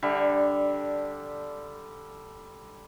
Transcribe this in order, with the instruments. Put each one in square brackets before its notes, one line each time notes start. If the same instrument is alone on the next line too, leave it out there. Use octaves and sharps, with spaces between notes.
[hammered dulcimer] D3 G3 E5